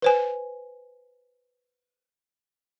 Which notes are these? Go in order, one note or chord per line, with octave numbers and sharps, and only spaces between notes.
B4 C5 G#5